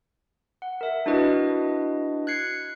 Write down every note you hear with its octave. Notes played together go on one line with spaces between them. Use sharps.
F#5
A#4 E5
D4 E4 F#4 B4 D#5
F#6 G#6 C7 C#7